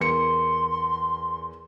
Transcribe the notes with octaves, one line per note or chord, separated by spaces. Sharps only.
E2 A#4 C6 C#7